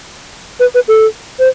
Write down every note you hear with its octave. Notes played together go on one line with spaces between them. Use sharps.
B4
B4
A4
C5